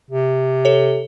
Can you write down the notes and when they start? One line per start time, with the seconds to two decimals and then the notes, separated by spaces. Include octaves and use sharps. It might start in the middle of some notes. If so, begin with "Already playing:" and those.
0.11 C3
0.65 A4 C#5